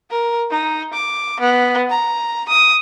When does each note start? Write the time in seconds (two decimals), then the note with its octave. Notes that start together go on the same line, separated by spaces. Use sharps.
0.10 A#4
0.50 D#4
0.93 D6
1.40 B3
1.90 A#5
2.49 D#6